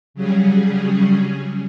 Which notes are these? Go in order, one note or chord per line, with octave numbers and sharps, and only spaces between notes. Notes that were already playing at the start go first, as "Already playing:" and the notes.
C#3 F#3 G3 C#4 G#4